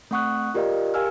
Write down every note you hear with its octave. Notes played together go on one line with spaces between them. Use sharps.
A3 C4 F#5 C#6 D#6 F#6
F4 G4 A#4 D5 D#5 F5
G4 A#4 F5 G#5 E6 F6